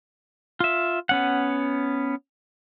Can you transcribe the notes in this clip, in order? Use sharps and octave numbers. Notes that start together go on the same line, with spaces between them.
F4 E5
B3 C#4 F#5